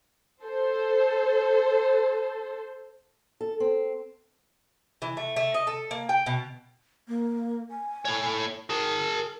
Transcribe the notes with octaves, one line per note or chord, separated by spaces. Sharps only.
A4 C5
A4
C4
E3
A3
A3
D#5
A4
A#3
G5
B2
A#3
G#5
A2 C#5
G#4 A#4 A5